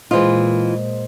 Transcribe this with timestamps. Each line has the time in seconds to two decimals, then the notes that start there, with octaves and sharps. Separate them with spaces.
0.11 A#2 E3 G#3 F4 C5 D#5